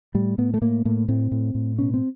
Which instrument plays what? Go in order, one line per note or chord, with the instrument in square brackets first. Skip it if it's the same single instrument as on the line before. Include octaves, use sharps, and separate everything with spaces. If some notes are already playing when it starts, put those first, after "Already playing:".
[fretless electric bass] A2 G3
A2 B3
A3
A2 A#3
A2 A#3
A2 C4
A2
A2
B2 C#4
C4